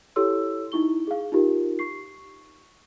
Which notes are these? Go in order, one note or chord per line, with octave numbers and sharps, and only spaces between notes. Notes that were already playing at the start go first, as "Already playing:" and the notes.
E4 G4 A4 C#5 C6 E6
D#4 E4 C#6 G7
G#4 F5
D#4 F4 G4 A#4
C#6 C7